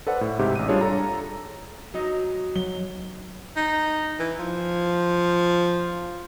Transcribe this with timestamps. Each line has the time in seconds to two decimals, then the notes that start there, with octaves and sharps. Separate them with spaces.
0.07 A4 B4 C5 D5 F#5
0.21 A2
0.39 G#2 C3 G4 E5
0.55 A1 D#7
0.68 G3 D4 F4 G#4 C#5
0.81 A4 A#5
1.94 F#3 D#4
2.56 F#3 G7
3.57 D#4
4.19 E3
4.39 F3